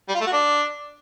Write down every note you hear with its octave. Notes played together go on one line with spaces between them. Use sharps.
G3
F4
A3
F#4
D4